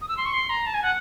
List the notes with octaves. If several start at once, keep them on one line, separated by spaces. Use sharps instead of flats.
D#6
E6
C6
C#6
C6
A#5
A5
G#5
F#5